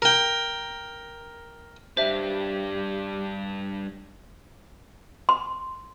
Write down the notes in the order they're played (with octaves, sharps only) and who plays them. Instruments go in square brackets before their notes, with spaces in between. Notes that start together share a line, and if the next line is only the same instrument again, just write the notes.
[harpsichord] A#4 G5
[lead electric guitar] G2 D4 [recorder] G4 [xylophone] C5 E5
[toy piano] C6